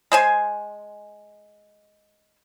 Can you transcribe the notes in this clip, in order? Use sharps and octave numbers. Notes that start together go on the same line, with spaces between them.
G#3 C5 G#5